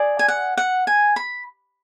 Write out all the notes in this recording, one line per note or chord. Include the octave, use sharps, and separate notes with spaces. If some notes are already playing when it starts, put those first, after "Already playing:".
Already playing: G#4 D5
G#5
F#5
F#5
G#5
B5